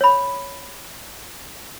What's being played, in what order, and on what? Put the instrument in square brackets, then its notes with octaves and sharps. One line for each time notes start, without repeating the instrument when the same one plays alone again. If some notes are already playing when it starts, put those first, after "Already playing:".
[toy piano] C#5 B5